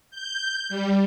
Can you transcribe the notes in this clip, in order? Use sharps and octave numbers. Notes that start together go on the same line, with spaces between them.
G6
G3